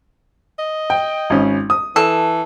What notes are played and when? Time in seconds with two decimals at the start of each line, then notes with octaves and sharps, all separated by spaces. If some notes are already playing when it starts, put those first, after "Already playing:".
0.59 D#5
0.90 G5
1.30 G#1 C#4
1.70 D#6
1.96 E3 A4